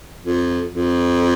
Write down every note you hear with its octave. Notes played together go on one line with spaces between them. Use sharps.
F2
F2